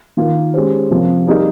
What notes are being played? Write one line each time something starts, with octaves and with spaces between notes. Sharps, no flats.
D#3 A#3 F4
G#3 C#4 G4 C5
C3 F3 A#3
G3 A#3 D#4 G#4 D#5